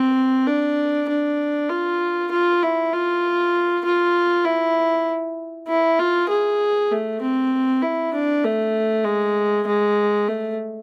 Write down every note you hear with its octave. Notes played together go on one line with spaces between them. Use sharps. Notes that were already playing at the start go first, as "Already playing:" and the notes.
Already playing: C4
D4
D4
F4
F4
E4
F4
F4
E4
E4
F4
G#4
A3
C4
E4
D4
A3
G#3
G#3
A3